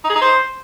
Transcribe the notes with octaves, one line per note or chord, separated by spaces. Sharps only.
D#4
G#4
D#4
C5